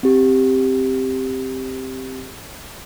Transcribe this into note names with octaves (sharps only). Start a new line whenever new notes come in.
C4 G4